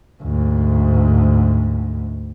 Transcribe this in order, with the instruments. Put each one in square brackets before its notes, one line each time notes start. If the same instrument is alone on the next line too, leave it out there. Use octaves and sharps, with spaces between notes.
[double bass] D2 G#2